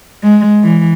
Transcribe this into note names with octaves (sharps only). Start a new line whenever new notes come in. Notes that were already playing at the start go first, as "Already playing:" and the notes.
G#3
E3